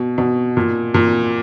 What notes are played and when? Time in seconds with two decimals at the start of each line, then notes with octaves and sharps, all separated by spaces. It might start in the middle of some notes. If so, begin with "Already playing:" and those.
Already playing: B2
0.18 B2
0.57 A#2
0.94 A#2